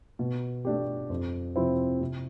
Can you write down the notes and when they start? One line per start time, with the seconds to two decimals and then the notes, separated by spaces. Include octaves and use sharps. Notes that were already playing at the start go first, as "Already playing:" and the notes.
0.19 B2
0.65 A3 D4 G4
1.10 F2
1.56 C3 F3 C4 E4
2.01 C3